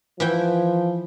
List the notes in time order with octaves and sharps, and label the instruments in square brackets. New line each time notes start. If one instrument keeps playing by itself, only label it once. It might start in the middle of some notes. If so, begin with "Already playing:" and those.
[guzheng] E3 E4 G5 [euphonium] F3